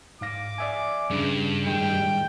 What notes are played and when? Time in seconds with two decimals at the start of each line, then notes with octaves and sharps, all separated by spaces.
0.21 G#2 F5 D6 A#6
0.58 D5 E5 G#5
1.10 G2 C#3
1.67 A2 D#3 G#3 G5